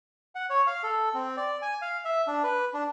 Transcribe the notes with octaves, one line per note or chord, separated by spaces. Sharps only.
F#5
C#5
F5
A4
C4
D5
G#5
F5
E5
D4
B4
D4